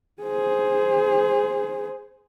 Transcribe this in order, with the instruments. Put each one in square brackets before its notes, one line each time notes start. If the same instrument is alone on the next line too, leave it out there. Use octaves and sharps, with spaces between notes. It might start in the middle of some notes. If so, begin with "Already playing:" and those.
[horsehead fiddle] G#4 C5